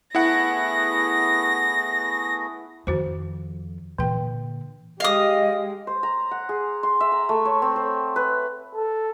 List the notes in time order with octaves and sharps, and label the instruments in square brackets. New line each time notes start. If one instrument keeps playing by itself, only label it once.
[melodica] A3 B3 G#4 [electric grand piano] E4 F#5 [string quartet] A#6
[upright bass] F2 [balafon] D#3 F#4 C5
[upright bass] A#2 D3 [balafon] E3 G5
[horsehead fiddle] G#3 G4 [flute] D#5 [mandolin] F5 D#6
[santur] C5
A#5
F#5
G#4
C6
E5
A#5
A3
C#5
C4
C5
B4
[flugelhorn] A4